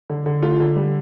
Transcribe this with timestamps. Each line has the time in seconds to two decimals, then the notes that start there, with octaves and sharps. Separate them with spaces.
0.10 D3
0.26 D3
0.43 A3 F4
0.60 D3
0.76 G3